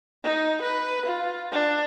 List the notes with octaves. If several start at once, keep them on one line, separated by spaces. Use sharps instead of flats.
D#4
B4
F4
D4